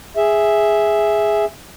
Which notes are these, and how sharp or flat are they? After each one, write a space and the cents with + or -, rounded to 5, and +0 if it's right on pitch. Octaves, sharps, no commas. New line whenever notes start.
G#4 +0 E5 +0